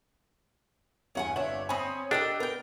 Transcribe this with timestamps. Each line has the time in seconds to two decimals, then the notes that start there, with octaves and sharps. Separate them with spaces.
1.15 E2 G2 C#4 F#5 G#5
1.36 G1 D4 C#5 E5 F#7
1.69 C4 C#4 G#5 B5 D#6
2.11 D4 G4 A4 A#4 D#5 G5
2.40 B3 A#4 G5